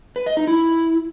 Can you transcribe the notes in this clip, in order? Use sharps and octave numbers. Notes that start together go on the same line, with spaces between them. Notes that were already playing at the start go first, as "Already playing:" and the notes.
B4
D#5
D#4
E4